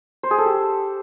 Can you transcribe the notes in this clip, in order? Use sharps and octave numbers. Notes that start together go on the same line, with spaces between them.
C5
G#4
A4
G4